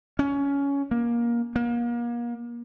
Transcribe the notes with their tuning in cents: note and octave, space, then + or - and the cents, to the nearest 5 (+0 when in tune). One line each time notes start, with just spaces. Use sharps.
C#4 +15
A#3 +20
A#3 +35